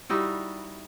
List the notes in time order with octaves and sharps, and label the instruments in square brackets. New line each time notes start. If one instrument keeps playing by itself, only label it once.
[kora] G3 D#4 E4 F#4